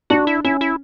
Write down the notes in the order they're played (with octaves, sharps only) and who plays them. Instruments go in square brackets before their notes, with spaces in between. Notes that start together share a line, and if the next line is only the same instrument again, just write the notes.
[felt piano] D4 [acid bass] F#4
[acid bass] E4
[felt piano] C#4 [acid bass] E4
[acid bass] E4